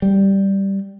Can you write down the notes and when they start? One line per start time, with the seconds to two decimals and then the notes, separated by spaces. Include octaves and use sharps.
0.02 G3